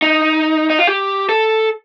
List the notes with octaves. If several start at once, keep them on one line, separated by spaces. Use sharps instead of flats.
D#4
D#4
F4
G4
A4